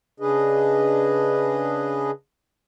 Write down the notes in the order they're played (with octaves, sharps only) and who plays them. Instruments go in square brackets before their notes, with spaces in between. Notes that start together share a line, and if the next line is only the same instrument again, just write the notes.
[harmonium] C#3 D4 G#4 B4 D#5